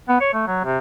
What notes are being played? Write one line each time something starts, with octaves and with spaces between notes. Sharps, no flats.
B3
C#5
A3
F#3
C3